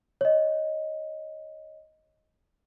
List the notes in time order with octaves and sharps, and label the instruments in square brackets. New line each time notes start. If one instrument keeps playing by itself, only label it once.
[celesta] C#5 D#5